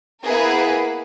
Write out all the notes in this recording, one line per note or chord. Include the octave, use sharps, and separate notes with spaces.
A#3 B3 E4 G#4 A#4 B4